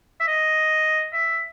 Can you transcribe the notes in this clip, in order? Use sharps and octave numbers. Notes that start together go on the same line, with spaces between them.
E5
D#5
E5